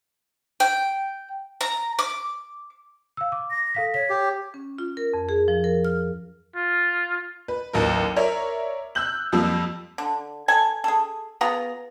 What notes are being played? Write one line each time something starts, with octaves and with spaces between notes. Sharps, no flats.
G5
A#5
D6
F5 E6
D6
A#6
A4 F5 B6
C#5 B6
G4
C#4
F4
A#4
F2
G#4
F3
A#4
F6
F4
B4
A1 D#2 F#3 A#4
A#4 C#5 D5 E5
E6 F#6 G6 F#7
F2 F3 G3 A#3 E6
D3
A4 G#5
G#4 A4
B3 F4 G#4 A#5